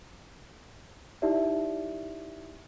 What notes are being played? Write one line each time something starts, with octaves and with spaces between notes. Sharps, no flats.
D#4 E4 G4 D5 E5